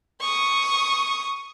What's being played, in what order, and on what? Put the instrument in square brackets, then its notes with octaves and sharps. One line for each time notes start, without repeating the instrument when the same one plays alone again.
[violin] C#6 D#6